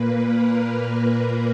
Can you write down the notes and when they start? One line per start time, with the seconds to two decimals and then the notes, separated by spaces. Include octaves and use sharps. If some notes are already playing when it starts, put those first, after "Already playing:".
Already playing: A#2 A#3 B4
0.24 A#4
0.73 A#4
1.21 B4